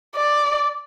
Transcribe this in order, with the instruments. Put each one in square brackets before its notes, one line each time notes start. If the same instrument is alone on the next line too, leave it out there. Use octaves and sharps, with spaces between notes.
[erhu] D5